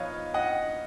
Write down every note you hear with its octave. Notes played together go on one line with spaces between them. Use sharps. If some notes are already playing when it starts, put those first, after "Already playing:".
Already playing: F3 B3 D#4 B4 C#5 D#5 F5
D#5 F#5